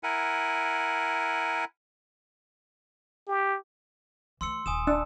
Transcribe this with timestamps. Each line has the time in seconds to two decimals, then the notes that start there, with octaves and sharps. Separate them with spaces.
0.03 E4 A#4 F#5 G#5
3.28 G4
4.41 E3 A3 C6 E6 C#7
4.66 D#1 G#5 D#6 E7
4.87 D4 E6